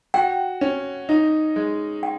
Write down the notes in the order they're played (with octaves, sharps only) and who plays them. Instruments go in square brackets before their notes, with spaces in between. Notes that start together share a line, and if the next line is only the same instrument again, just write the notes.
[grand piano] F#4 [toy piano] G5
[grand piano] C#4
D#4
G#3
[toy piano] G5